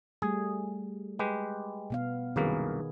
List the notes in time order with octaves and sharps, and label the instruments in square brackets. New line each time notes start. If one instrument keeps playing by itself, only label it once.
[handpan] G3 A3 [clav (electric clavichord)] G#4
[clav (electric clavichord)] G#3 G4 B4
[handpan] B2 B3 F5
[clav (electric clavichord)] C2 F#2 A#3 [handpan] D#3 G#4 B4